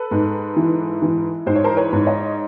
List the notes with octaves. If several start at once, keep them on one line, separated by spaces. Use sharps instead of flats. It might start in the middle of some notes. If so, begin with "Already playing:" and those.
Already playing: A4 B4
G#2
E3
E3
G#2 C5
C#5
A#4 C5
B4 C#5
G#2
C#5 D#5